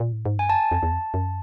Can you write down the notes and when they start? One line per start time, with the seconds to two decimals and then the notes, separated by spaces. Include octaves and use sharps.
0.00 A#2
0.12 A2
0.26 G#2
0.38 G2 G#5
0.50 F#2 A5
0.71 F2
0.83 E2
0.92 F2
1.14 F#2